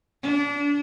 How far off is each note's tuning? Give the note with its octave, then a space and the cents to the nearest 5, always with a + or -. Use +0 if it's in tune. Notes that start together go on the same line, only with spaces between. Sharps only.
D4 -30